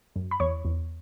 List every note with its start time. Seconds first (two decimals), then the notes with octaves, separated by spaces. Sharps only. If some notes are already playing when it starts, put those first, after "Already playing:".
0.16 F#2
0.31 B5
0.40 E2 C#5 C#6
0.65 E2